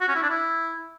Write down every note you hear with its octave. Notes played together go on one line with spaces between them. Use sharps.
F#4
C#4
E4
D4
E4